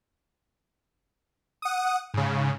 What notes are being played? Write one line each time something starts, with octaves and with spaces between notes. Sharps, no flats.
F#5 D#6
G#2 C#3